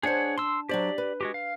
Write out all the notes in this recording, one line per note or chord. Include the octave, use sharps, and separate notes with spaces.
D4 G#4 C5 C#5 F#5
A5 C6 E6
F#3 D4 G4 C5 D5
B4
G#3 F#4 G4
F5